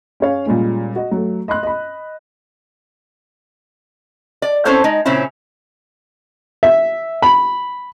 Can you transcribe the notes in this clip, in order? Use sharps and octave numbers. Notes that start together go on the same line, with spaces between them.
C#4 G#4 C#5 F5
A#2 G3 G#3 C#4
F#4 D#5
F#3 A3
D#5 B5 C6 F#6
D#5 B5
D5
C4 C#4 E4 A4 C5 C#5
G#3 D#4
A#2 C#3 C4 C#4 E4
E5
B5